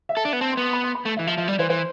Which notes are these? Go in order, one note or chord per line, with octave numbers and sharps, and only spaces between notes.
E5
A4
D4
B3
C4 A5
C6
B3
C6
B5
C6
B5
A3
E5
E3
F3 E5
F3 E5
G3 D5
E3 C5
E3 C5